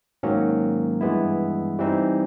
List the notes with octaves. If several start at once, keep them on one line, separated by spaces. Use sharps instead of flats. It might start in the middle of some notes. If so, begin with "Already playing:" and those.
G#2 D#3 F#3 A#3 C#4
G2 E3 G#3 B3 E4
E3 G3 C4 D#4